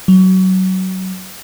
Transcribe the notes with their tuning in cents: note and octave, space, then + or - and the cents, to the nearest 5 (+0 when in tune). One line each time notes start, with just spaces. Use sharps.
F#3 +20